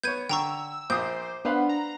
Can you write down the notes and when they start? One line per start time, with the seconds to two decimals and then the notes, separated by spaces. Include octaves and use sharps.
0.03 B3 C#5 G6 G#6 D#7
0.29 D3 G5 A#5 C#6 E6
0.90 A#1 C5 D6 D#6 G6
1.45 B3 D4 B4 C5 F5 F#5
1.69 A#5